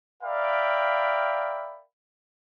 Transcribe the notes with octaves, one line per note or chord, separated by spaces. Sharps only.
A#4 D5 E5 F5 G5 B5